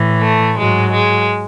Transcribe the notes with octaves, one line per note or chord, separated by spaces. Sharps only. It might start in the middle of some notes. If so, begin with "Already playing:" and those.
Already playing: A2 E3
A3
G#2 F#3 G#3
G#3